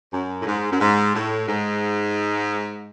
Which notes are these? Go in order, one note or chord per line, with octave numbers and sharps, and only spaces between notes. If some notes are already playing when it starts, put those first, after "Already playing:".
F#2
A2
G#2
F#2
G#2
A2
G#2